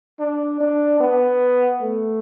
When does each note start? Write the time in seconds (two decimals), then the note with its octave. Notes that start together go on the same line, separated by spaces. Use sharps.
0.19 D4
0.60 D4
1.00 B3
1.81 A3